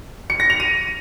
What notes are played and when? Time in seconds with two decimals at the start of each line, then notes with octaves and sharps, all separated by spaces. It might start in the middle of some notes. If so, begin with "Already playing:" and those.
0.30 C#7
0.40 A#6
0.50 F7
0.60 D#7